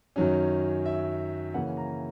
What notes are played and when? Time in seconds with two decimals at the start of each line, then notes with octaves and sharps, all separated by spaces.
0.16 F#2 D#3 F#3 C#4
0.86 E5
1.54 C#3 E3 A#3 C#4 F#5
1.77 A#5